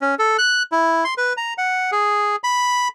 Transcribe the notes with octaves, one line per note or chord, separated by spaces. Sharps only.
C#4
A4
F#6
E4
C6
B4
A#5
F#5
G#4
B5